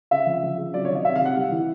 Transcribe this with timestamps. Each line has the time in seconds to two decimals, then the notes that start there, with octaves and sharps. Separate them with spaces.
0.11 C#3 E5
0.26 F3
0.43 F3
0.58 C#3
0.74 F#3 D5
0.85 C#5
0.90 D#3
0.95 D#5
1.05 C3 E5
1.16 F5
1.21 C3 F#5
1.36 G3
1.52 E3